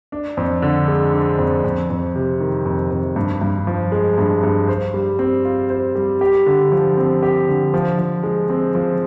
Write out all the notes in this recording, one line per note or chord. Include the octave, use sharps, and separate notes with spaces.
D4
F2
D3
G#3
D4
F2
F2
F2
C3
D#3
F2
F2
G2
G2
F3
G#3
G2
G2
C5
G3
C4
F4
C5
G3
G4
D3
F3
C4
G4
D3
F3
F3
G#3
C4
F3